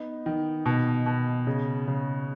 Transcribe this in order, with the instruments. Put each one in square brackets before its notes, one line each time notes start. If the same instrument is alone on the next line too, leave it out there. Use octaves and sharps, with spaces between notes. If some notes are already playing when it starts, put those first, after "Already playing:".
Already playing: [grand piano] B3 D#4
D#3
B2
B2
C#3
C#3